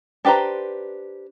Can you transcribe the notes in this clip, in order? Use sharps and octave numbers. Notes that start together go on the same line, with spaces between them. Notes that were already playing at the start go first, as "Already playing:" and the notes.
D4 G4 B4 C5 A#5